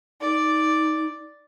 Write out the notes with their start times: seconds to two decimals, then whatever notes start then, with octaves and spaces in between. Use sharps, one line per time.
0.21 D#4 D5